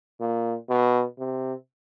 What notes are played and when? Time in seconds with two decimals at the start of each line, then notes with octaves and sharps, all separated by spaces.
0.20 A#2
0.69 B2
1.18 C3